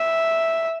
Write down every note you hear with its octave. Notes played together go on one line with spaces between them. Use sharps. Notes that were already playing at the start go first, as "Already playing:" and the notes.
Already playing: E5